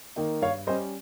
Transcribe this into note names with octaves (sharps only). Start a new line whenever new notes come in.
D#3 A#3 D#4
G2 C#5 F5
G3 C#4 C5 D#5